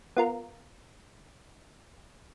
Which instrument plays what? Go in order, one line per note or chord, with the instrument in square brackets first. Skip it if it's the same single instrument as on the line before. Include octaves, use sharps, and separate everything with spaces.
[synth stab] B3 F4 A#4